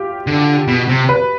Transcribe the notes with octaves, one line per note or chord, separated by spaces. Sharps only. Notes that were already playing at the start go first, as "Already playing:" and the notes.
Already playing: F4 G4
D3
B2
C3
B4